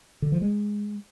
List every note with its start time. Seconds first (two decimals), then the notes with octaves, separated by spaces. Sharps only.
0.22 D3
0.32 F3
0.42 G#3